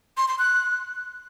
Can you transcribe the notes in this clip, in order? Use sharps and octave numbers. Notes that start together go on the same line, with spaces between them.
C6
C6
F#6